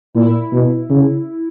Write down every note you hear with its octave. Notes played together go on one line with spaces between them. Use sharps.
A#2 E4
B2
C#3